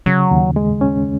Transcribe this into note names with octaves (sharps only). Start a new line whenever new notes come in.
C#3 F#3
D#2
G#3
C#4